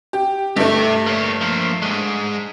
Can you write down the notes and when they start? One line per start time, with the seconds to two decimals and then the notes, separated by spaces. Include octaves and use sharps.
0.13 G4
0.56 G2 A3 G4 E5
1.07 A#3 C#5
1.41 F3 A#3
1.82 G#2 G#3